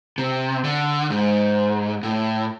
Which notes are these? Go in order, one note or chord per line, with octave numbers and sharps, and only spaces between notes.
C3
D3
G#2
A2